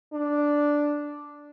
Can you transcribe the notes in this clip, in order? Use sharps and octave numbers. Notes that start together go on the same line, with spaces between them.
D4